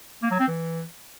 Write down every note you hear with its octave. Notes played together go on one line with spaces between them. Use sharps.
A#3
F#3
C4
E3